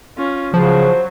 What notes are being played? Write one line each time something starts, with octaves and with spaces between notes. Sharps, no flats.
C#4 F4
C#3 F3 F#3 C5